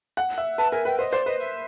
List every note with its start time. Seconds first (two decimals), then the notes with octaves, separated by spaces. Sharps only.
0.17 F#5
0.38 E5
0.58 B4 A5
0.72 A#4 G#5
0.85 B4 G5
0.99 C5 D#5
1.12 C5 D5
1.26 B4 D#5
1.40 E5